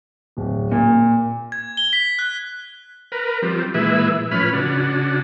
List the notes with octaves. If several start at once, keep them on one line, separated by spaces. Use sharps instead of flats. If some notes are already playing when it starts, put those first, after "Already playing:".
D1
A#2
G#6
G7
B6
F#6
A#4 B4
F3 G3 C4
A#2 E3 G#3 B4 E5
A2 F3 C#4 B4 B5 F6
C#3 D4 F#4